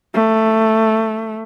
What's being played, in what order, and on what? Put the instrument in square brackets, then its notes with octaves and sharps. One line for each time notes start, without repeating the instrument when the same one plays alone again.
[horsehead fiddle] A3